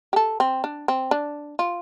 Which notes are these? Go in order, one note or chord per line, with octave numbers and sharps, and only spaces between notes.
G4
A4
C4
D4
C4
D4
F4